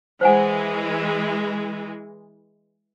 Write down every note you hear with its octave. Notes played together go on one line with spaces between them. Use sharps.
E3 G#3 C5 F#5 G#5